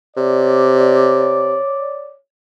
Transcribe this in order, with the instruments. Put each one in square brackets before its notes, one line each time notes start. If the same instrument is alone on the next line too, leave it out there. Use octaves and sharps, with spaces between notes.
[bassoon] C3 [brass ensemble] C#5 D5